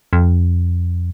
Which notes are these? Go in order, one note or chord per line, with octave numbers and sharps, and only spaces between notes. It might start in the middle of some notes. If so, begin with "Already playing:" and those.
F2